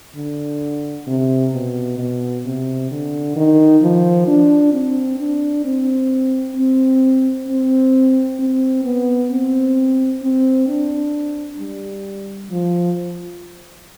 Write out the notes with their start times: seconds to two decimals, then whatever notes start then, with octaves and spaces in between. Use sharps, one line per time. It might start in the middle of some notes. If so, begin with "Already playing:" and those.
0.16 D3
1.07 C3
1.53 B2
1.98 B2
2.45 C3
2.91 D3
3.36 D#3
3.82 F3
4.27 D4
4.73 C4
5.19 D4
5.65 C4
6.56 C4
7.48 C4
8.39 C4
8.84 B3
9.31 C4
10.22 C4
10.68 D4
11.59 G3
12.51 F3